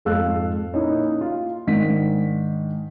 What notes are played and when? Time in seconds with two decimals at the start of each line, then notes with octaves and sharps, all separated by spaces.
0.05 F2 G#2 A4 F5 E6 F#6
0.73 A#2 A#3 C#4 D#4 E4
1.21 F4
1.67 G#2 D#3 D4 B6